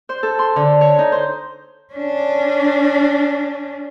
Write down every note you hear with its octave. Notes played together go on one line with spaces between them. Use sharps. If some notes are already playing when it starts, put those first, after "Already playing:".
C5
A4
C6
D3
C#5
D#4
C5
C#4 D4